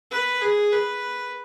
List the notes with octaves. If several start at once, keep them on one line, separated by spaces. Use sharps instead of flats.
B4
G#4
B4